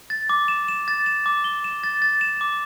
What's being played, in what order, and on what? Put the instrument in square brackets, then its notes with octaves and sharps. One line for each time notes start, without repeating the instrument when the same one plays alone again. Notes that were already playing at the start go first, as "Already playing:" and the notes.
[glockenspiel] A6
D6
E7
E7
A6
E7
D6
G7
E7
A6
A6
E7
D6